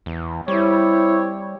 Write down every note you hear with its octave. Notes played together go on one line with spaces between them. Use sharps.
E2
G3 C4 E4 G4 C#5